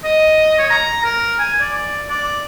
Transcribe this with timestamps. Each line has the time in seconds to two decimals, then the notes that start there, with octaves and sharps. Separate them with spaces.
0.04 D#5
0.58 C#5
0.70 A#5
1.04 A#4
1.39 G#5
1.61 D5
2.09 D5